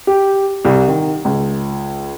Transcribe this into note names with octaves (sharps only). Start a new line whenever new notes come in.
G4
C2
D#3
C#2